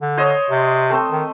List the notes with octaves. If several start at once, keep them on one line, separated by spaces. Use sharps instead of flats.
D3
C5 C#5 D#5
C3
A3 C4 C5
D#3